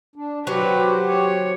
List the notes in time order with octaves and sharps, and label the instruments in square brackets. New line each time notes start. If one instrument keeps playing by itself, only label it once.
[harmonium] D4
[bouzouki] F#3 [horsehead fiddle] F#4 B4 [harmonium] G4 C5
[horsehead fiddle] C#5